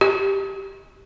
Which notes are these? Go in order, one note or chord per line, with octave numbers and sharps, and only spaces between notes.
G4